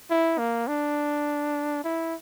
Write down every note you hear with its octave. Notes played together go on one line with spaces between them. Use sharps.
E4
A#3
D4
E4